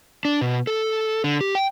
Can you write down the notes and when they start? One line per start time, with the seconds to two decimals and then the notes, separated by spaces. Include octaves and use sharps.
0.25 D4
0.41 B2
0.67 A4
1.24 D3
1.41 G4
1.55 G5